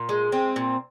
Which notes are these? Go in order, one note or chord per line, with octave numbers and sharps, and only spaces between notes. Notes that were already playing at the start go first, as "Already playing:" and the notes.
Already playing: A#2
G#3
C4
A#2